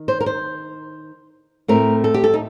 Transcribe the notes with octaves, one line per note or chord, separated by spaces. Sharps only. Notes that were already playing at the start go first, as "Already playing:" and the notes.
Already playing: D#3
C5
A#4
C5
A2 A3 C4 A#4
A4
G4
A4
D#4